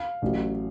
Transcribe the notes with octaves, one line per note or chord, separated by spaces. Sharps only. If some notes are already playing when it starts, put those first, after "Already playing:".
Already playing: F5
A1 A2 F#3